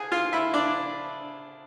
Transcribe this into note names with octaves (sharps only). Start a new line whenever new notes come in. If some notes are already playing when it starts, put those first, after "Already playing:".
Already playing: C2 G#4 G#5
F4 F5
E4 E5
D4 D5